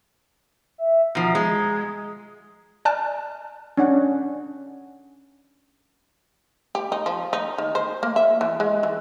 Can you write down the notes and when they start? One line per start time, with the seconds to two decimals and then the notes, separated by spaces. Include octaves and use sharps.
0.78 E5
1.15 B2 F3 A#5
1.35 G#3
2.85 D5 G#5 A5 F6 F#6
3.77 C#4 D4 F#5
6.75 G4
6.92 D#4
7.06 F3
7.33 D#4
7.58 D#3
7.75 C5
8.03 A#3
8.16 E5
8.41 E3
8.60 G#3
8.83 E3